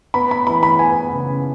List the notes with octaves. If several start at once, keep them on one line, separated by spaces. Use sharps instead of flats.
B3 B5
B5
E3 B5
B5
B3 G#5
C#3